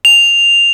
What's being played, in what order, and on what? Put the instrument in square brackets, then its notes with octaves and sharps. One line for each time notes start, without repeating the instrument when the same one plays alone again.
[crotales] F7